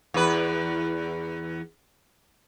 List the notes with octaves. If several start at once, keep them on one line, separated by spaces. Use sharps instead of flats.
E2 B4